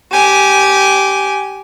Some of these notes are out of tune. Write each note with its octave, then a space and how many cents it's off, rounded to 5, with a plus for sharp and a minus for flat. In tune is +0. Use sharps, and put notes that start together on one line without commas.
G4 -10 G#5 +5